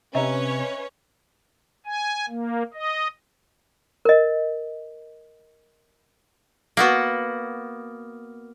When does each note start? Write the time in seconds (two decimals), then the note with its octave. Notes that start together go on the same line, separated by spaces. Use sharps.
0.15 C3 C#4 B4 C#5 D#5 E5 A#5
1.86 G#5
2.29 A#3
2.74 D#5
4.05 A#4 D#5
6.77 A#3 B3 F#4